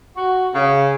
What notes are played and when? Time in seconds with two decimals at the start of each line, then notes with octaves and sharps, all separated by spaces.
0.17 F#4
0.54 C#3